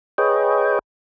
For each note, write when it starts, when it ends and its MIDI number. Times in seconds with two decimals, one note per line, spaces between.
0.18 0.79 68
0.18 0.79 71
0.18 0.79 73
0.18 0.79 75
0.18 0.79 79